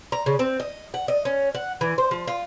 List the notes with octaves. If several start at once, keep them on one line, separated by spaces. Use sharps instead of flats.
A#5
C#3
C4
D#5
F#5
D#5
C#4
F#5
E3
C5
F3
F4